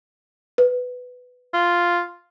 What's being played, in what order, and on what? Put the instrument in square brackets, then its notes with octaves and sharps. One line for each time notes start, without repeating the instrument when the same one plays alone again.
[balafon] B4
[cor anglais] F4